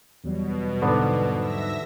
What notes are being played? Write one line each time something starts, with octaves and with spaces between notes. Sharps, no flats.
E2 B2 F#3 G3
G#2 D3 B3 D5
E5 E6 A#6